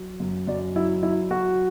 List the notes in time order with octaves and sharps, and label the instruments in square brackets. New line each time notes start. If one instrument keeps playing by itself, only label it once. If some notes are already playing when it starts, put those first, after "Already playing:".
Already playing: [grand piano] F#3
F#2
F#2 D5
F#3 E4
F#3 E4
F#3 F#4